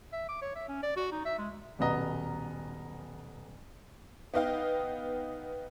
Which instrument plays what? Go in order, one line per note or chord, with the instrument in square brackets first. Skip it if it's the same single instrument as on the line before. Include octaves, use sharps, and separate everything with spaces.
[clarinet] E5
D6
C#5
E5
C#4
D5
F#4
D#4
E5
G#3
[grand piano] D#1 B1 B3 D#5 A#5
[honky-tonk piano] B3 D#4 D#5 F5 G5